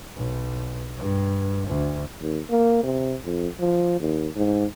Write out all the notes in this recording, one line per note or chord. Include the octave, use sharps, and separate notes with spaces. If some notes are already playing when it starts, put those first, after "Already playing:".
B1
G2
D2
D#2
A#3
C3
F2
F3
D#2
G#2